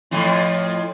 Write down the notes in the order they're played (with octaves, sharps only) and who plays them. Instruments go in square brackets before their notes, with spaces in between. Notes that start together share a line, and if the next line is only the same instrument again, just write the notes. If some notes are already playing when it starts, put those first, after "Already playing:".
[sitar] F2 A2 F3